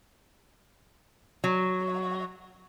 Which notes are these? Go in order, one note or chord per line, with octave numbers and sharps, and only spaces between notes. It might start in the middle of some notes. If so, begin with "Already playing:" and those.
F#3